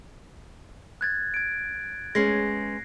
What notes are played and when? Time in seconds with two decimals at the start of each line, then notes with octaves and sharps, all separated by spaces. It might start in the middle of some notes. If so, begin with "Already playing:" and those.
1.01 F#6 G#6 A6
1.34 G#6 D7
2.15 G#3 B3 C#4 A#6 C7